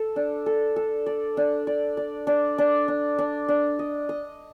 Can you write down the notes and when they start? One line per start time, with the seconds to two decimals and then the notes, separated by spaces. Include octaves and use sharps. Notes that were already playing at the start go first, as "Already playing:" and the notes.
Already playing: A4
0.16 D4
0.46 A4
0.76 A4
1.06 D5
1.37 D4
1.67 D5
1.97 D5
2.27 D4
2.58 D4
2.88 D4
3.19 D4
3.48 D4
3.79 D#5
4.09 D#5